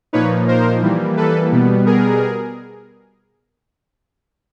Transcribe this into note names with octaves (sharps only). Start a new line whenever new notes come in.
A#2 F3 A#3 D#4 B4 C#5
A#4 C5
E3 G3 A#3
A4 B4
B2 G3 B3
G#4 A#4